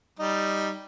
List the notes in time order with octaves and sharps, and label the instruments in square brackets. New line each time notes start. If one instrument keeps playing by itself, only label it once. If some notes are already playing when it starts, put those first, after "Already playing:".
[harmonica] G3 D#4